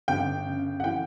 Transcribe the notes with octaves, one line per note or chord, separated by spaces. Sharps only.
G1 G5
C#3
F#5
E3 G5